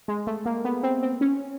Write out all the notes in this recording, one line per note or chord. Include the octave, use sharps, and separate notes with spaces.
G#3
A3
A#3
B3
C4
C4
C#4